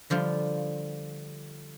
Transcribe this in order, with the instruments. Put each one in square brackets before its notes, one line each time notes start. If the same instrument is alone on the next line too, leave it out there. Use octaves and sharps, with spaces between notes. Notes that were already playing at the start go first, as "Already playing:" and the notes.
[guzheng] D3 F3 G3 F4